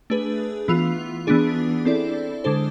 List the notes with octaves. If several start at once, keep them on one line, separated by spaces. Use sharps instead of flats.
A3 D4 G#4 B4
E3 B3 F4
E3 B3 D4 G#4
C4 E4 A4 D5
D3 G#3 D4 A4 C5